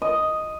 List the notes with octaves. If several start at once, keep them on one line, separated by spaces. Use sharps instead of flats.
D#5